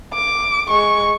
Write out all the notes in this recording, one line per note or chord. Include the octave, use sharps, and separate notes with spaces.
D6
G#3 C#6